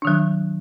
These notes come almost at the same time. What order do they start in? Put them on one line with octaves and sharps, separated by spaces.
D4 D#3 F#3